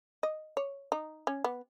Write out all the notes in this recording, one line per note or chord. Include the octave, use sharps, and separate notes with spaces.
D#5
C#5
D#4
C#4
B3